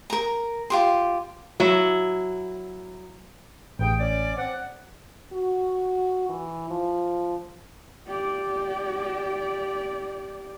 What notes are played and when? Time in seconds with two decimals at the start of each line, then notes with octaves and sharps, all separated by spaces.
0.10 A#4 A#5
0.70 F4 G4 C6
1.60 F#3 E4
3.79 A1 G2 G#4 G5
3.99 C#4 D5
4.37 C4 D5 F#5
5.33 F#4
6.29 E3
6.70 F3
8.07 G4 D5